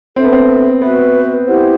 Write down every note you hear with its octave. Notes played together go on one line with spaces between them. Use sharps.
C4 D4 A4 E5
B3
C4
B3 F#4 B4 E5
E4 G4 C5 F#5